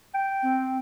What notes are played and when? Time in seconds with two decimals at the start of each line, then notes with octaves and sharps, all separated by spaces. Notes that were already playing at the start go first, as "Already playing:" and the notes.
0.14 G5
0.43 C4